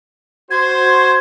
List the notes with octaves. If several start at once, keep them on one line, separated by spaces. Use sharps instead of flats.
F#4 C5 G#6